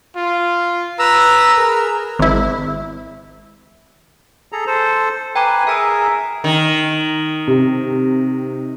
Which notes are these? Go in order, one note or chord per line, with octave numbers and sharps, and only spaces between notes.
F4
B4 A#5 E6
G#4 A#4
G#1 E4
G#4 A4 A#5
A4 C5
B4 G5 G#5 A#5 D6
G#4 A#4 E5 G#5 A#5 E6
D#3
C3